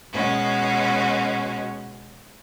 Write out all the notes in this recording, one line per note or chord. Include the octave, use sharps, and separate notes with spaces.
B2 G#3 C#4 F#4